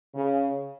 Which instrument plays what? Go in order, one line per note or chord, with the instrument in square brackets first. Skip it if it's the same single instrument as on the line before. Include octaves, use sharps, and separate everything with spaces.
[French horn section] C#3